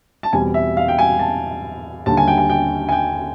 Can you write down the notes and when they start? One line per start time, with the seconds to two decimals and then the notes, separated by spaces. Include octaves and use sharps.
0.23 A5
0.33 E2 B2 G3 C4 G#5
0.54 E5
0.77 F5
0.88 G5
0.99 G#5
1.19 A5
2.06 D#2 D3 G3 A5
2.17 G#5
2.28 G5
2.38 G#5
2.50 G5
2.89 G#5
2.92 G5